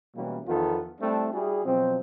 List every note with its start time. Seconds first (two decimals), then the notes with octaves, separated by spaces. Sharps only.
0.15 B2 E3 G3 G#3 A#3 C#4
0.47 E2 D#3 F3 B3 F4 A4
1.01 G3 A3 C4 D4 E4
1.32 G3 E4 F#4 G#4
1.65 B2 F3 F#3 C4